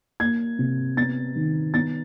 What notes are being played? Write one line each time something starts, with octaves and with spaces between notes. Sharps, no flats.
A#3 G#6
C3
B3 A6
D#3
B3 A6